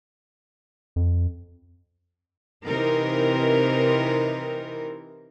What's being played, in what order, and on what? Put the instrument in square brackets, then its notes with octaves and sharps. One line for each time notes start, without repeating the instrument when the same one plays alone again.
[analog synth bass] F2
[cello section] C3 E3 C4 D#4 A#4